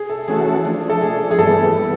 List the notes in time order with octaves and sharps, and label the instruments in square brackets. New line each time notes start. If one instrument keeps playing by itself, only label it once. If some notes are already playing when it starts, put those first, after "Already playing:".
Already playing: [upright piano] G#4
A4
[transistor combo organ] E3 A3 C#4 F#4 A4 [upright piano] G#4
[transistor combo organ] F3 A3 D4
[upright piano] A4
[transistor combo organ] F3 A3 D4 [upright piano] G#4
[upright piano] G#4
[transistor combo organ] G2 E3 G3 B3 [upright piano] A4
[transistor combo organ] E3 G3 B3